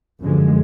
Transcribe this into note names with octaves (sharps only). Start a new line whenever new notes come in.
F#2 D3 F3 G#3